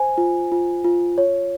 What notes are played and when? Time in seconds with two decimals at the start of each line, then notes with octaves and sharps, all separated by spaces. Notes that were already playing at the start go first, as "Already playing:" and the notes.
Already playing: C5 G#5
0.18 F4
0.52 F4
0.84 F4
1.18 C#5